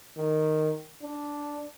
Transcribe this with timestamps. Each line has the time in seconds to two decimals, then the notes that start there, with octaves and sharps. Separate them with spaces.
0.17 D#3
1.02 D4